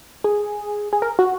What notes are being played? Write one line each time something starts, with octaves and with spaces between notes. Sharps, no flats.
G#4
G#4
A#4
F#4